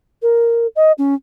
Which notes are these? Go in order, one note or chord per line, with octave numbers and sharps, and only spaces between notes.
A#4
D#5
C#4